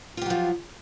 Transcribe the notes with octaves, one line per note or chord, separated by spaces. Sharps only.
F3 F#3 F4 G4